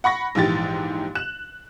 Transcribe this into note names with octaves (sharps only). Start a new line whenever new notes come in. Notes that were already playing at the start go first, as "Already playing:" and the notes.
F#5 B5 C#6 A#6
A#1 G#2 E3 G4 A6
F#6 E7